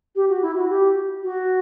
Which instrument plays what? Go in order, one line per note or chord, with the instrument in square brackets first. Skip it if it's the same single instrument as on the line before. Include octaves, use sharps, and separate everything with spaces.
[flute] G4
F#4
E4
F#4
G4
F#4